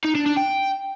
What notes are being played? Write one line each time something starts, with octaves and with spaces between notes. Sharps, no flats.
D#4
D4
D4
G5